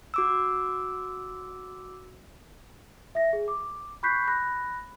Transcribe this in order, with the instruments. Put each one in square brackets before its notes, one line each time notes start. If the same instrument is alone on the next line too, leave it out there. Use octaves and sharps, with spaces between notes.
[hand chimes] F#4 D6 E6
[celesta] E5 A#6
G#4
D6
B5 C#6 F#6 G6 B6 C7
B5 F#6 A#6